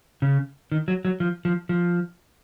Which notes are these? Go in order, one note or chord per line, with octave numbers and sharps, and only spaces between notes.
C#3
D#3
F#3
F#3
F3
F3
F3